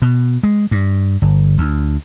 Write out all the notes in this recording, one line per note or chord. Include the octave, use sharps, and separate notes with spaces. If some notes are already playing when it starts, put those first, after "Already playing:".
B2
G#3
G2
G1
D2